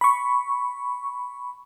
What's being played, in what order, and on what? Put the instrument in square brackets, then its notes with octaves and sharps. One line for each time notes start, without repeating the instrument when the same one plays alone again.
[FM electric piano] B5 C#6